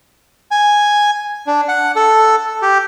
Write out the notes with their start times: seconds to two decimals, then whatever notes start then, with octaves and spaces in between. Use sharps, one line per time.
0.51 G#5
1.47 D4
1.68 F#5
1.96 A4
2.62 G4